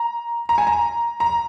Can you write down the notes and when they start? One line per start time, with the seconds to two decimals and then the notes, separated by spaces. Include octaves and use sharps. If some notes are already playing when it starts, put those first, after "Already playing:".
Already playing: A#5
0.49 A#5
0.58 G#5
0.67 A#5
1.20 A#5